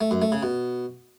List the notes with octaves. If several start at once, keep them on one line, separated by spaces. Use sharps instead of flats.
A3
F#2
A3
C#3
B2